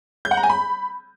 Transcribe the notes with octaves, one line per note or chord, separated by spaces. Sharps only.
G6
F#5
A#5
G#5
B5